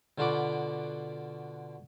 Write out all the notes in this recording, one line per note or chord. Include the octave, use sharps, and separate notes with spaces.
B2 D3 F4 F#4 B5 D6